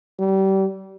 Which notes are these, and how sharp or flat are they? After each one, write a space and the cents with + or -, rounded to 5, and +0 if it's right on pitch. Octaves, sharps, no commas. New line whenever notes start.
G3 -30